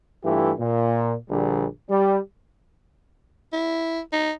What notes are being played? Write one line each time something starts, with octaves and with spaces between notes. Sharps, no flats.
G2 E3 A3 E4 F4 G4
A#2
A#1 D3 G3
G3
E4
D#4